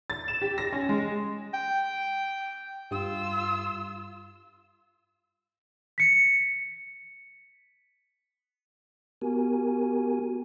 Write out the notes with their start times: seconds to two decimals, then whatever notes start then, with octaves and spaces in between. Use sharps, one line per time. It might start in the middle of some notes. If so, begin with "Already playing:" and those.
0.10 A6
0.28 E7
0.42 G4
0.58 A#6
0.73 C#4
0.89 G#3
1.54 G5
2.91 G2 F4 E6
5.98 B6 C#7
9.22 B3 F#4 G4 A#4 G#5